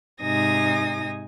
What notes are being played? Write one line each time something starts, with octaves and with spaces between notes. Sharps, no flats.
G#2 C3 D#4 G#5 D#6 A#6